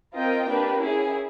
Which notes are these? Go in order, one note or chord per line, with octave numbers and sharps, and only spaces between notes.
C4 F4 A#4 D#5 G5
A#3 D4 G4 B4
C#4 E4 G#4